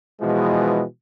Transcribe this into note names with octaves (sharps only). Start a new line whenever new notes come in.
B2 E3 F3 G#3